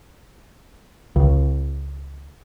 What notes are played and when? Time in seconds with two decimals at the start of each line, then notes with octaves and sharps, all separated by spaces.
1.16 C#2